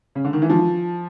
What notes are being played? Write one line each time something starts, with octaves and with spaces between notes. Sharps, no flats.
C#3
D3
D#3
E3
F3